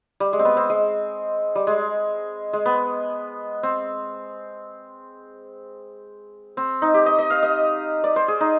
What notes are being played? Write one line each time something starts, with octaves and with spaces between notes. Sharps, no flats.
G3
G#3
C4
B3
C4
G#3
G3
G#3
G#3
B3
C4
C4
D#4
G4
D#5
D#5
F5
D#5
D5
C5
G#4
D#4